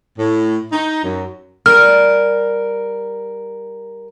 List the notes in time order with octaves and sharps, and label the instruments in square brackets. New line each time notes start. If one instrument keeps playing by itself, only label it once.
[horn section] A2
D#4
F#2
[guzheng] G3 [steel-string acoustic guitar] A#4 [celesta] F6